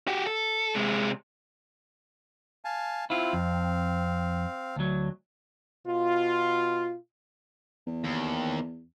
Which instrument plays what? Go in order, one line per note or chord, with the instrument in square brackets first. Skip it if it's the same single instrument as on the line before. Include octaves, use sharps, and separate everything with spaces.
[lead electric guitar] F#4 G4
A4
C3 G#3
[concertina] F5 G#5 A5
[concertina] C4 F5 [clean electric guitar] E4 F4
[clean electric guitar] F2
D2 F#3
[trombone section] B2 F4
[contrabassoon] E2
[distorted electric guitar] D#2